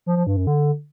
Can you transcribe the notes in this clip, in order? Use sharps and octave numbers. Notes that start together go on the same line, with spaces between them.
F3
F3
G2
F#2
D3